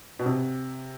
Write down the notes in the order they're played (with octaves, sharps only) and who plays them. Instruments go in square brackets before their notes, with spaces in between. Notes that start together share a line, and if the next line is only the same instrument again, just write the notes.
[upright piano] B2
C3